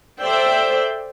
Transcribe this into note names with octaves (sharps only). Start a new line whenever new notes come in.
A4 C5 D5 E5 G5